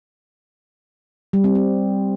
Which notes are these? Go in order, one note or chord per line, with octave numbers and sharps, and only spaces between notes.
G3
C4
C4